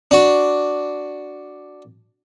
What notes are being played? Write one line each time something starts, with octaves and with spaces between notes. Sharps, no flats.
D4 F#4